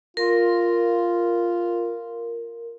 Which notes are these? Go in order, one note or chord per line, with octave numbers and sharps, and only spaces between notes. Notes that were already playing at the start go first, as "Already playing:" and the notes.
F4 A#4